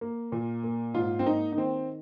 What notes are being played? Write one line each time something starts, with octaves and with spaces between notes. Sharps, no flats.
A#3
A#2
A#3
G#2 F4
C4
A#3 D#4
D#4
D#3 C4